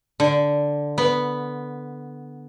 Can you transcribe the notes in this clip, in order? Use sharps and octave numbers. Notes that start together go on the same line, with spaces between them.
D3
B3